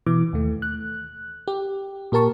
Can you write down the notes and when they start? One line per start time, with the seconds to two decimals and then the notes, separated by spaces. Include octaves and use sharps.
0.06 B2 E3 D6
0.33 D#2 A3
0.62 F#6
1.48 G4
2.12 A#2 G4 A#4 A5 C#6